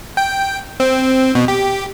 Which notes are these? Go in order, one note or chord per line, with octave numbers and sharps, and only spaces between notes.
G5
C4
B2
G4